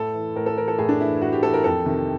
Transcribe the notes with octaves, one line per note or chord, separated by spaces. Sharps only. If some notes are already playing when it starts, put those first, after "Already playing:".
Already playing: A2 A4
E3
A2 A#4
A4
E3 A#4
A4
A2 G#4
D4
E3 E4
A2 F#4
G4
E3 A4
A#4
F2 A4
C3 D#3